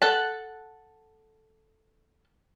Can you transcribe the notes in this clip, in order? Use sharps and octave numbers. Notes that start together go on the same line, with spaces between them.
A4 F#5 A5